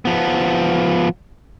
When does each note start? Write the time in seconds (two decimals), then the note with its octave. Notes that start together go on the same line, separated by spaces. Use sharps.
0.05 F3 B3